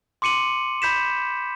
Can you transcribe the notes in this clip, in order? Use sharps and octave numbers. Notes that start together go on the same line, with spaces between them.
C6 D6 C#7 D#7 F#7
B5 G6 B6 E7